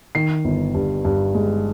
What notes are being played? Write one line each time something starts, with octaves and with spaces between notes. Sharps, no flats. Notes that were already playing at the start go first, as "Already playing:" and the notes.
D#3 C7
G1
G2
G2
G#3